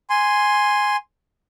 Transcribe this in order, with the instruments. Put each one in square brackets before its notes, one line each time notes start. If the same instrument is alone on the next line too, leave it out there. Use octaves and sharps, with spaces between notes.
[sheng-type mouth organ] G#5 C6